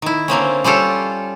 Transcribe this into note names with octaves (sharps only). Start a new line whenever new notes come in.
D#3 E4
D3 A#3 C4 C#4
G3 C#4 F4 G4 A4